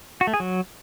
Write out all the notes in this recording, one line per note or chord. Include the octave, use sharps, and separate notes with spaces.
F#4
A3
G#4
F#3